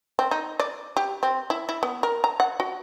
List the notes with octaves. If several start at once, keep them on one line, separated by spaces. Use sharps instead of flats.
C4
D#4
D5
G4
C4
E4
E4
B3
A#4
A#5
F#5
F#4